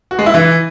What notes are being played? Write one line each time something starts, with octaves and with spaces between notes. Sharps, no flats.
F#4
G#3
E4
E3